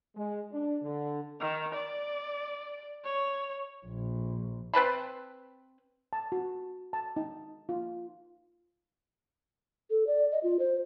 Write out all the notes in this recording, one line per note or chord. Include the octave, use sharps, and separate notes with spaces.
G#3
D4
D3
D#3
D5
C#5
A#1
C4 B4 A5 B5
A5
F#4
A5
D#4
F4
A4
D5
D#5
F4
C5